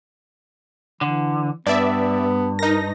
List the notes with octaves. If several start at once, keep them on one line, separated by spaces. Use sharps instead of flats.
D3 E3
G2 B3 D5 E5
D#4 A#4 A#6